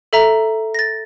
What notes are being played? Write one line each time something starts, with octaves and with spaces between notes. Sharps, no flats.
A4 E5 A#5
A6 A#6